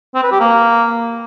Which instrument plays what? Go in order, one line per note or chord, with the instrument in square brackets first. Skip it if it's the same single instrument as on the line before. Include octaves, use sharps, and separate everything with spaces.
[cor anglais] C4
B4
G4
A#3